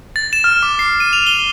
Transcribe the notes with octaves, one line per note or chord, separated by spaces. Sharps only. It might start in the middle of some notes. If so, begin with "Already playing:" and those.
A6
E7
F6
D6
C7
D#7
F7
G7